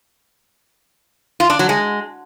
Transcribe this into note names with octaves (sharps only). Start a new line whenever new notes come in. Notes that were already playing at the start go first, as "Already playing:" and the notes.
F4
D4
F#3
G#3